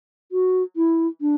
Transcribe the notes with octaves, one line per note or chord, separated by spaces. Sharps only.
F#4
E4
D4